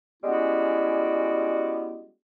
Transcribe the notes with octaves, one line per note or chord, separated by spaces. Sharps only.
G3 G#3 B3 C#4 E4 F#4